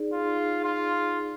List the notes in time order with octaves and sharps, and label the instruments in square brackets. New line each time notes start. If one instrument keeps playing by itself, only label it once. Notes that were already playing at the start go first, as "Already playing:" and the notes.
Already playing: [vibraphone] D#4 G#4 D5
[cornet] F4
F4